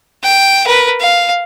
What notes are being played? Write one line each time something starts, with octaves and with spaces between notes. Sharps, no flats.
G5
A#4 B4
F5